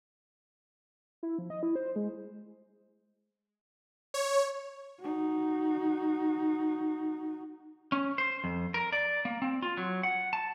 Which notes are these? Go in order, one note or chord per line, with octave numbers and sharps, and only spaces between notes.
E4
F3
D#5
E4
C5
G#3
C#5
D#4 F#4
C#4
C5
F2
A#4
D5
A#3
C4
F4
F#3
F#5
A5